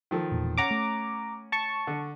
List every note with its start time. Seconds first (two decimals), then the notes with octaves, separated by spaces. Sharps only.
0.11 D#3 F3 A4
0.32 E1 E2 A#2
0.58 C#4 F#5 A#5 D6
0.71 A3
1.52 A5 C#6
1.87 D3